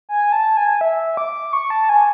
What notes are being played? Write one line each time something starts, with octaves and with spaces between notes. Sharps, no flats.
G#5
A5
G#5
E5
D6
C#6
A5
G#5